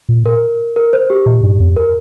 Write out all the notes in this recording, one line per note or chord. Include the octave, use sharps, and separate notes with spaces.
A#2
A#4
A#4
C5
G4
A#2
G2
F2
A#4